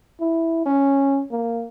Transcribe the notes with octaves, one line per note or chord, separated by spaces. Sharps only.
E4
C#4
A#3